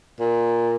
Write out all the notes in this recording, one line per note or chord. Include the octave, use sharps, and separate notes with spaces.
A#2